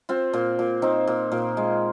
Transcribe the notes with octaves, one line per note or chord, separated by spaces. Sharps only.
C4 F4
A#2
A#2
C4 D#4
A#2
A#2
G#3